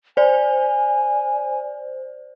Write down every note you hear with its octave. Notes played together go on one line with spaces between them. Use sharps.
C5 D5 G#5